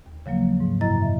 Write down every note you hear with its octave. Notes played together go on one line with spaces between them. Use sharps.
D#2
C#3 F3 F#3 A#3
G#2
F#2 C3 E4 D#5 A#5 A6
E5